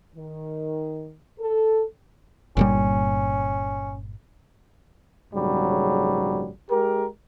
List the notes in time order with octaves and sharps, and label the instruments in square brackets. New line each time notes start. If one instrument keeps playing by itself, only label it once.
[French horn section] D#3
A4
[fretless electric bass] G1 A#2 G3 [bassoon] C#4
[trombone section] A#1 G#2 C#3 F#3 G3
G#3 G4 G#4 A#4